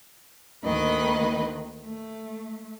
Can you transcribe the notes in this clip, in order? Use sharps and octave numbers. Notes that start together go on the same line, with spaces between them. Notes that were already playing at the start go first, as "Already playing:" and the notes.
D2 D#3 A#3 B4 D#5 B5
A3